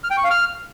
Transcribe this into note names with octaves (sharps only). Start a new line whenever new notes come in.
F6
G5
C#6
F5
F6